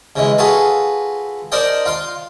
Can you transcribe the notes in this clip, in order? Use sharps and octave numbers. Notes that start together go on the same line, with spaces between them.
C#3 E3 G#3
F4 F#4 G#4 A4 B4
D4 A#4 C5 D5 D#5 G5
F4 F5 C6